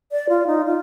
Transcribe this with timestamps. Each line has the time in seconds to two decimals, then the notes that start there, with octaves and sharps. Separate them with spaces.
0.12 D5
0.29 F4
0.47 D#4
0.65 F4